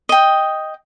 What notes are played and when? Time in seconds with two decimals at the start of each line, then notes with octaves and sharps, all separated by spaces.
0.09 D#5 G5